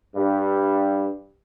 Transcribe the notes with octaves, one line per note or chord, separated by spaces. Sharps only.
G2